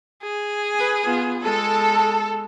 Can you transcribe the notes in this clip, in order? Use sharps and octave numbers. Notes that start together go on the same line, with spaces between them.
G#4
B4 G#5
B3 F4
G#3 A4